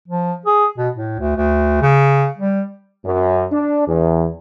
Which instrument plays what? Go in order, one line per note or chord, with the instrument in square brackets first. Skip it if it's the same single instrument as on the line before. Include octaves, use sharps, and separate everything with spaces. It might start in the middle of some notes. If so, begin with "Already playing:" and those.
[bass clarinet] F3
G#4
B2
A2
D2
D2
C#3
G3
[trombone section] F#2
D4
E2